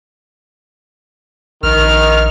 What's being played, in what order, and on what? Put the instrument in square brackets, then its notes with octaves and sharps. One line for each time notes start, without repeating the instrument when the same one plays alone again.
[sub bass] A#1 [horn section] D#3 [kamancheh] F6